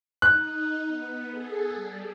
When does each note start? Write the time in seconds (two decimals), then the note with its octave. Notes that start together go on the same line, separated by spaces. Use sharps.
0.22 D#4 F#6
0.86 B3
1.30 G#4 A4
1.74 G3